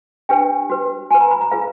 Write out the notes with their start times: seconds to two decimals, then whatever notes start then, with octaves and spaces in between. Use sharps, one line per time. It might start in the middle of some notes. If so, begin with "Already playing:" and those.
0.29 D4 G4 B4 G5
0.70 F#4 B4
1.10 F#4 G#5
1.14 B4
1.21 A#5
1.31 B5
1.41 A#5
1.51 F4 G#4 B4 F5